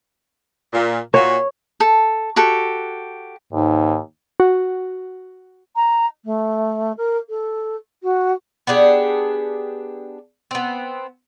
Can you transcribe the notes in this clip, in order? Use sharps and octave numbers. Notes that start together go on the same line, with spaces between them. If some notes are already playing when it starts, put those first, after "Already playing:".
A#2
A#2 F#4 C#5
A4
F#4 G4 A4
D#2 G#2
F#4
A#5
A3
A#4
A4
F#4
B3 D4 G4 G#4
B3 C4